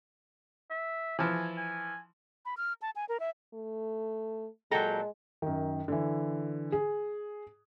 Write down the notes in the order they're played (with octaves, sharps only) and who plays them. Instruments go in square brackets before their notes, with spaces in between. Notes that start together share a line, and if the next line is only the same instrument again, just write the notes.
[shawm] E5
[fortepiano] E3 F3 [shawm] G#5
[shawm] G#5
[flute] B5
F6
A5
G#5
A#4
E5
[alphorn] A3
[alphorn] A#2 [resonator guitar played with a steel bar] F#3 A4 [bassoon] G#3 [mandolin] G5 A#5
[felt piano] F#2 D#3
D3 E3
G#4